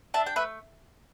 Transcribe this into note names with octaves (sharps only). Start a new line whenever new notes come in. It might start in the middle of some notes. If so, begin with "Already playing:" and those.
D4 E5 A5
G5
A3 B4 E5